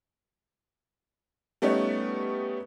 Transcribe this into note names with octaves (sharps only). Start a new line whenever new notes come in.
G3 A3 B3 C#4 D#4